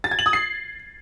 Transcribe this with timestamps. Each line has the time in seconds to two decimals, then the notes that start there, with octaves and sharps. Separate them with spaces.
0.04 A6
0.11 G#6
0.19 F#7
0.26 D#6
0.33 C7